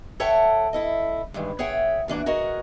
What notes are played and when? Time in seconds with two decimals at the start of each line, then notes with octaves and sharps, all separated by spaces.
0.20 A4 C#5 E5 F#5 G5 A5
0.73 E4 A4 D#5
1.34 G2 D#3 E3 G#3
1.59 G#4 C#5 E5 F#5 G5
2.08 A#2 E3 D4 F#4
2.26 F#4 G#4 A#4 D#5 F#5